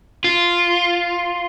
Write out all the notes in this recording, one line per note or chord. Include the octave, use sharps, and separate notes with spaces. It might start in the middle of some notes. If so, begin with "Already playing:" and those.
F4